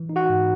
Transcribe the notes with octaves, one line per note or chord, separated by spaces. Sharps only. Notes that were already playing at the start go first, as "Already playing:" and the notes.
Already playing: E3
D#4
F#4 F#5
G#2